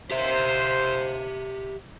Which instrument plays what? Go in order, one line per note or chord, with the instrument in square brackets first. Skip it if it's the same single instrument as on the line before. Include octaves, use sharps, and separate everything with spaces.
[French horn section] D#2 C5 [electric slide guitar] G4 E5